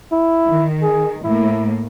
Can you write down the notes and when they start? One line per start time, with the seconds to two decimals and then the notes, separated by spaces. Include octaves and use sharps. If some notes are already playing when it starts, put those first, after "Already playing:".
0.13 E4
0.47 D#3
0.83 G#4
1.24 A2 A#3 E4